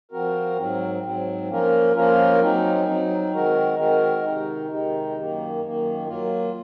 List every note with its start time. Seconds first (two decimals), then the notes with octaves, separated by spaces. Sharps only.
0.11 F3 C4 F#4 A#4
0.56 G#2 F#3 C4
1.03 G#2 F#3 C4
1.49 F3 A#3 C#4 F4 A#4
1.95 F3 A#3 C#4 F4 A#4
2.41 F#3 C4 D#4
2.86 F#3 C4 D#4
3.33 D#3 G#3 C4 F#4 A#4
3.78 D#3 G#3 C4 F#4 A#4
4.24 C3 D#3 G#3 D#4
4.70 C3 D#3 G#3 D#4
5.15 F#2 D#3 A#3
5.62 F#2 D#3 A#3
6.07 F#3 A#3 F4